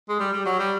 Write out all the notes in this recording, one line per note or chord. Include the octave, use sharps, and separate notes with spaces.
G#3
G3
G3
F#3
G3